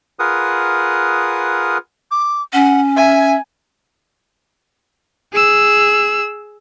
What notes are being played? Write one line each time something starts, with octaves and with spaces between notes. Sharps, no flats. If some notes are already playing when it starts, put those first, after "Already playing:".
F4 G#4 A#4 B4 F#5 D#6
D6
C#4 F#5
E5 G#5
G#4 E6